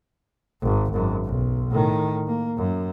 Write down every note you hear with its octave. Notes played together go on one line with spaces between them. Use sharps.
G#1
G#1 F#2
B1
A2 D#3
A#3
F#2